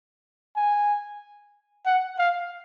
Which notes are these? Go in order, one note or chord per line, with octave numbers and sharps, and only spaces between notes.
G#5
F#5
F5